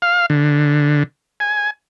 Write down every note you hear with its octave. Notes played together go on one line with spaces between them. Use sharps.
F5
D3
G#5